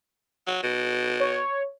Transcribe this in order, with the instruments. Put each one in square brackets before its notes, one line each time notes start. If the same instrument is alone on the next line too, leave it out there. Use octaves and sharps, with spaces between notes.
[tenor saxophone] F#3
B2
[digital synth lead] C#5